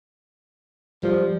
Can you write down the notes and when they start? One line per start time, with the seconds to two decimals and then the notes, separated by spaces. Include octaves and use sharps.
1.03 F3 G3